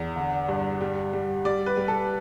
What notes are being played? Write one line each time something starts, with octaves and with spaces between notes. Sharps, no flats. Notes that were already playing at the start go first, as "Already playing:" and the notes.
Already playing: E2
D3
G2
G3
G3
G3 D5
B4
G3
A4